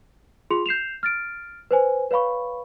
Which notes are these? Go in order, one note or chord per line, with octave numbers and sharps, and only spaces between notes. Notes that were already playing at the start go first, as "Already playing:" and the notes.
F4 G#4 C6 F7
G6 C7 E7 F7
F6 A6 D7
B4 C5 G#5
B4 C#5 F5 B5 C#6